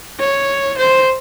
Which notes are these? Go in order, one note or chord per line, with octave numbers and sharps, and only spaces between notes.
C#5
C5